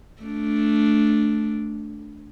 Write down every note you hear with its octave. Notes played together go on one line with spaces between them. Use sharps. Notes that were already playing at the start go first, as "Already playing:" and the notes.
A3 D4